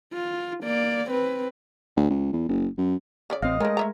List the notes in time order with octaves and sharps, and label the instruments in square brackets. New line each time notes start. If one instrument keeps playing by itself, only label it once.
[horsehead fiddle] F4
A#3 D5
C4 B4
[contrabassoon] D2
C#2
E2
F#1
F#2
[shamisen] C#3 C#4 D5
[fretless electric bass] A1 C4 [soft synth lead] D#5 [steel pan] F5
[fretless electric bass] G#3 [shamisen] A3 C#4 [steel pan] A#4
[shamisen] A3 E5 A#5